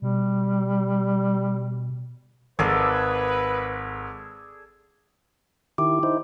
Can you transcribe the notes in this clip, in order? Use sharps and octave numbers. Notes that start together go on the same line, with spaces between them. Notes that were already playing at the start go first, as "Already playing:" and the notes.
B2 G3
G#1 G#4 A4 B4 D5
D#3 E4 G4 D6
D#4 E4 C5